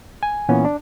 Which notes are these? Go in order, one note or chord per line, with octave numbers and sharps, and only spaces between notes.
G#5
A#2 E3 B3 C#4
D4